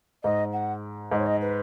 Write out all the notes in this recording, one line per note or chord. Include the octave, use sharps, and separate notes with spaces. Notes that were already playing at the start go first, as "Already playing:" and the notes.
G#2 D#5
F#5
G#2 D#5
C#5
D#5
B4